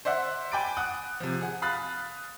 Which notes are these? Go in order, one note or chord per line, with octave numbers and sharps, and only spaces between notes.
C5 D5 E5 F#5
G5 G#5 B5 D6 A6 D7
F#5 D#6 F#6
C3 F3
G#4 F#5
F5 B5 D#6 F#6 A6